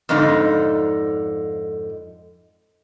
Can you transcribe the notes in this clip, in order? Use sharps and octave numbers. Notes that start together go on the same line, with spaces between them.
F2 G#2 D3 D#4